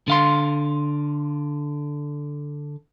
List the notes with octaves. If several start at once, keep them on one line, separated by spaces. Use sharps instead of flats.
D3 F5 C6